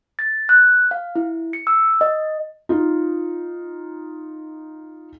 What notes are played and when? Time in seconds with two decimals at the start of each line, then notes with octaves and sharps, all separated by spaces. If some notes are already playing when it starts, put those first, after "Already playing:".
0.19 A6
0.49 F#6
0.91 F5
1.16 E4
1.53 C#7
1.67 E6
2.01 D#5
2.69 D#4 F4